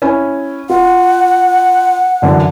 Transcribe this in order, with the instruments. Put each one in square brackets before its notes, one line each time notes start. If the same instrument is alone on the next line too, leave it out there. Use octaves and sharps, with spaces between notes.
[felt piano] C#4 E4 G#5
[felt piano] F4 [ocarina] F#5
[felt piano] F#2 D3 E3